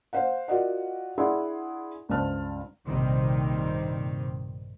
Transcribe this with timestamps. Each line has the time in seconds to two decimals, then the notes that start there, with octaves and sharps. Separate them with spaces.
0.13 C5 F5 F#5
0.48 F4 F#4 A#4 D5 D#5 F#5
1.18 D4 E4 G#4 D5 F#5 C6
2.09 C#2 G2 C5 A5 F6
2.89 A#1 G2 C3 D#3 G3 C4